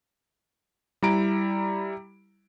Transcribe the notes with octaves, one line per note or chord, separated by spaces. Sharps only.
G3 E4 A#5 D7